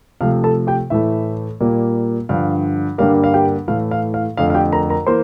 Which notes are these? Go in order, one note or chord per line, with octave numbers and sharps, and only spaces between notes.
C3 F3 A3 F5
A4 A5
G4 G5
A2 E3 A3 E5
A#2 G3 A#3
G2 D3 F3 F5
G2 D3 G3 A#3 F5
F5
G4 G5
A2 E3 A3 F5
F5
F5
F2 D3 A3 F5
F5
G4 G5
A#4 A#5
A#4 A#5
E3 A#3 C5 C6